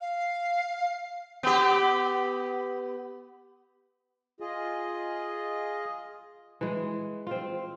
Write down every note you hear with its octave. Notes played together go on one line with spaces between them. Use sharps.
F5
B3 G4
F4 G#4 D#5
E3 G#3
C4 F4